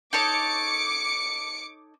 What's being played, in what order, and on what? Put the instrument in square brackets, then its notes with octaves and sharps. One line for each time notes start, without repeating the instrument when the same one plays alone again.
[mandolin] D#4 A4 C#5 [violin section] D6 C#7